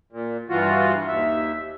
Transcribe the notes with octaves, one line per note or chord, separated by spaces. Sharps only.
A#2
G2 E3 F4 F#4
D#2 E5